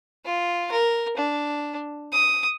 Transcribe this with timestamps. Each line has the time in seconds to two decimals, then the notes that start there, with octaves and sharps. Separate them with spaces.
0.25 F4
0.72 A#4
1.17 D4
2.12 D#6